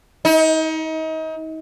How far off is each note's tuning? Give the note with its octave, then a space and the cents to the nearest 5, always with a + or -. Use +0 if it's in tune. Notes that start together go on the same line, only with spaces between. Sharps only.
D#4 +35